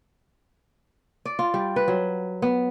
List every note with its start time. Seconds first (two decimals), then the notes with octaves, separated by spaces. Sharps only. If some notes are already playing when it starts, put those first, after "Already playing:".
1.25 D5
1.39 F4
1.54 G3
1.76 B4
1.88 F#3
2.42 B3